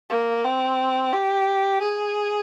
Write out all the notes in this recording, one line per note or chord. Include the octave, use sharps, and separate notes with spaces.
A#3
C4
G4
G#4